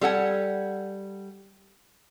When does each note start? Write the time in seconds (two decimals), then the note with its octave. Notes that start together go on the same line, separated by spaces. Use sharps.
0.01 G3 A4 F#5 G#5